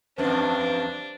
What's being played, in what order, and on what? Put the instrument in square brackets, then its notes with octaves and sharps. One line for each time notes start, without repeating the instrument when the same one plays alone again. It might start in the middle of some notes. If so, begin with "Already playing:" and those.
[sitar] E2 G2 D5 [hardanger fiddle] D4 [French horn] B4 [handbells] C5